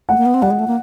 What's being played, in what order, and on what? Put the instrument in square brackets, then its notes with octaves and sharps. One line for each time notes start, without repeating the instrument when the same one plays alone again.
[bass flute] A3 [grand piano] F#5
[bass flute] A#3
B3
C4
[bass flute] G3 [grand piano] F#5
[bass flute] G#3
A3
A#3